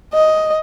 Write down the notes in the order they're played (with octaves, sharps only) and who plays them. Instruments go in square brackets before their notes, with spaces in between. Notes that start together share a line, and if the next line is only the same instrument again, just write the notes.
[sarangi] D#5